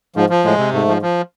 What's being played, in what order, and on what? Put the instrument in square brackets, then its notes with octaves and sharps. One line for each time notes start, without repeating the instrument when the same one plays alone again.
[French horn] G#2 [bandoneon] F3
[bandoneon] F3
[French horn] A2 [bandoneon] G#3
[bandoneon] C3
[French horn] G#2 [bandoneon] A3
[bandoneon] F3
F3